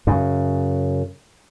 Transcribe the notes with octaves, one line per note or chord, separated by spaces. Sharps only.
F#2 C#3